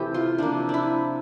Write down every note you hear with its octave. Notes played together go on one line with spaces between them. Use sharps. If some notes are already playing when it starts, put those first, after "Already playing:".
Already playing: C3 E3 A3 G4
F4
C3 F3 A#3 D4
D4 E4